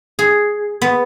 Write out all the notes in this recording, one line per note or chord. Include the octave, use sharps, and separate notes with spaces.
G#4
B3